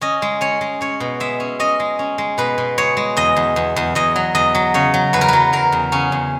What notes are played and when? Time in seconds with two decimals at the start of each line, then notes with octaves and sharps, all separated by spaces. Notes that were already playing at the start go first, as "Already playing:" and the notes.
0.01 C#4 D#5
0.22 G#3
0.41 C#4 C#5
0.61 G#3
0.81 C#4 C#5
1.00 B2
1.20 G#3 E5
1.40 C#4
1.59 C#4 D#5
1.80 G#3
1.99 C#4
2.18 G#3
2.38 B2 B4
2.58 B2
2.78 G#3 C#5
2.97 G#3
3.17 E2 D#5
3.36 E2
3.56 E2
3.76 E2
3.95 E2 D#5
4.16 F#3
4.35 E2 D#5
4.55 F#3
4.74 C#3 C#5
4.94 F#3
5.13 E2 B4
5.21 A#4
5.28 F#3 B4
5.53 E2 A#4
5.72 E2
5.92 C#3 C#4
6.12 E2